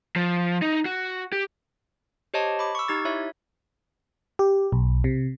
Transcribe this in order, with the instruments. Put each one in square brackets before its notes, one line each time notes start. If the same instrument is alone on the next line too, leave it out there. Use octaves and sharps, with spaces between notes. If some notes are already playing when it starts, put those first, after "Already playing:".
[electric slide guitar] F3
D#4
F#4
G4
[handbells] G4 C5 C#5 D#5 A5
B5 D6
C#6 E6
D#4 G4 G#6 A6
E4 C#5 E5
[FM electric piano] G4
B1
C3